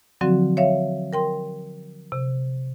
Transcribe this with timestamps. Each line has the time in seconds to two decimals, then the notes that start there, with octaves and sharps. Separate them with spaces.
0.21 D3 F3 F#3 C4 F#4
0.57 C#5 E5 F5
1.13 A#4 G5 C6
2.12 C3